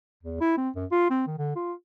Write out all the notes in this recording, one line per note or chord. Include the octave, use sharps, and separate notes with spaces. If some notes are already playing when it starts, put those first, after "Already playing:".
E2
E4
C4
F#2
F4
C4
D#3
D3
F4